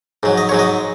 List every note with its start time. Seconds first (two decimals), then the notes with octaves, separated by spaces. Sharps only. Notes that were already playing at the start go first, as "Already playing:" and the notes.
0.23 G#2 F#3
0.37 D#5
0.49 G#2 F#3 C#5
0.59 D#5